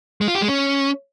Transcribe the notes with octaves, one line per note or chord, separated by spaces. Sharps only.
G#3
F4
G4
G#3
C#4